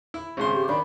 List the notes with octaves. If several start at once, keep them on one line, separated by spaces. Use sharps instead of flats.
E4
G#1 C#3 G#3 C6
G4
D#3 D4 B5